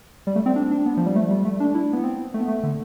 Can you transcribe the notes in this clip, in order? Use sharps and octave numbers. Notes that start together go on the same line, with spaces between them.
G3
A3
C4
D4
D4
B3
F3
G3
A3
G3
A3
D4
E4
B3
C4
A3
B3
A3
D3